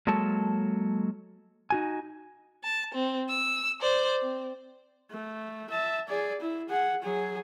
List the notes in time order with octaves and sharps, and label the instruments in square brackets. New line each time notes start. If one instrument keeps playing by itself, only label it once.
[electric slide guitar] F#3 G#3 A#3 A4 C#5 A5
D#4 F#4 G#5
[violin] A5
C4
E6
C5 D5
C4
[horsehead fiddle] A3
E5 A5
G#4 D5
E4
G#4 F#5
F#3 G#4